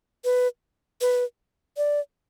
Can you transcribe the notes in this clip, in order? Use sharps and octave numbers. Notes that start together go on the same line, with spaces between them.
B4
B4
D5